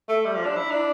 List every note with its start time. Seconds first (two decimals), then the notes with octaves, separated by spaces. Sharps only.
0.09 A3
0.25 G3
0.36 F3
0.46 D4
0.56 E4
0.71 D4